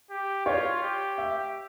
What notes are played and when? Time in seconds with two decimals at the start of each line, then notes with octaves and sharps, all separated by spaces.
0.10 G4
0.46 F4 C#5
0.82 G4
1.18 E5